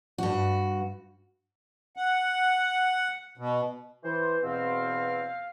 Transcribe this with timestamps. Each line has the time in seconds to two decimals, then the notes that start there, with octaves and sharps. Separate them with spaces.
0.18 G2 F#4
1.96 F#5
3.37 B2
4.04 E3 C5
4.43 E2 B2 C4 F5